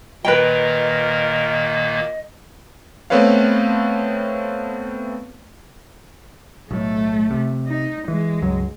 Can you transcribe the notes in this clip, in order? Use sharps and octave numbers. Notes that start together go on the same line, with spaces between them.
A#2 D#3 A#3 B4 D#5 G5
A3 B3 C4 B4 C#5 F5
B1 A2 A3
C3
D#4
E3 G#3
C#2 G2 F#3